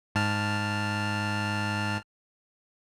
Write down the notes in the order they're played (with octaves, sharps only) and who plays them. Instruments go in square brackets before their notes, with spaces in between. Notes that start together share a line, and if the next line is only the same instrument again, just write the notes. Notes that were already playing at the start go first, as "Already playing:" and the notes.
[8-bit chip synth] G#2 A5 F6